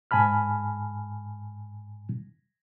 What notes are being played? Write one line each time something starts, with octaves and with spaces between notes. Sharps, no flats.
G#2 G#5 A5 B5 F6